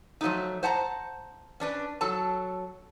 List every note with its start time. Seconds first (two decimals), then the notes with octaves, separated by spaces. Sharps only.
0.21 F3 F#3 A3 D#4
0.63 C5 F#5 A5 A#5
1.60 C#4 D4 B4
2.01 F#3 A4 A5